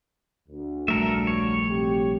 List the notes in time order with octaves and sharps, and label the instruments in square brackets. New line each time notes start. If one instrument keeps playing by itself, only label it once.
[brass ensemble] D2
[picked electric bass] A#1 G3 A3 [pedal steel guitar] A4 A#4 E5
[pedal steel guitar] C#5
[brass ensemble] C3 F#3 G4